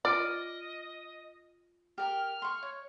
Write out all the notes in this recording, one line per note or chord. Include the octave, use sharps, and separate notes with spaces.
F4 D5 D#5 F6 D7
G4 A#4 F6
C6 C#6
C#5